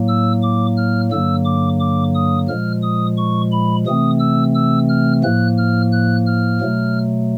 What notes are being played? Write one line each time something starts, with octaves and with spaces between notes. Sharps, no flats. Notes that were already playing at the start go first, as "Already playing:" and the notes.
Already playing: A2 F#3 A#3
E6
D6
F6
G2 D3 F#3 A#3 E6
D6
D6
D#6
A#2 F3 G#3 F6
D#6
C#6
B5
C3 E3 A3 C4 D#6
E6
E6
F6
A2 F3 A#3 F#6
F6
F#6
F6
B2 F#3 A3